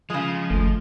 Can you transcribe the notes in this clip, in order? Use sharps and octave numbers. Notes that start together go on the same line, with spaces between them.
C#3 F3 G#3
F#1 D#2 A3